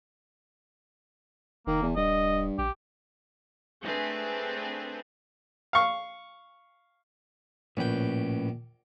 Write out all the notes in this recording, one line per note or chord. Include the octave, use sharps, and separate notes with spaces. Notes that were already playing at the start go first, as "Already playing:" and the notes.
F1 D#3 A#3
E2
D#1 G2 D#5
A#1 G4
A3 C4 D4 G#4 B4
F5 C#6
A#1 A2 C#4 B4 G5